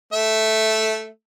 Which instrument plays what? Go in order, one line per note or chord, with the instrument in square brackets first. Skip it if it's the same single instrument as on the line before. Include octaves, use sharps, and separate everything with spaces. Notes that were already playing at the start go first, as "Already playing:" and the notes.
[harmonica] A3 E5